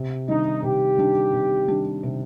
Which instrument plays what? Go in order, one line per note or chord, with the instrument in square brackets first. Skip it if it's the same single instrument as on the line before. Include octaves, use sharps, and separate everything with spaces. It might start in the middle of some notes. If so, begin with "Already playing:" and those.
Already playing: [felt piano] C3
[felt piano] D#3 G3 D4 [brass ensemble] D#4
[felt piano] C3 [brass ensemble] G4
[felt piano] D#3 G3 D4
C3
D#3 G3 D4
C3